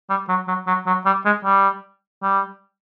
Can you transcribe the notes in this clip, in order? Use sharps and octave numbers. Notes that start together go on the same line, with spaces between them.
G3
F#3
F#3
F#3
F#3
G3
G#3
G3
G3